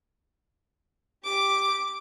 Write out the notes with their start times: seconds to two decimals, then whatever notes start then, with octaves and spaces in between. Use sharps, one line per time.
1.24 G4 D6